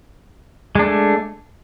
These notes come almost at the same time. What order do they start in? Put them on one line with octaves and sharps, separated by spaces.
G#3 D4 A3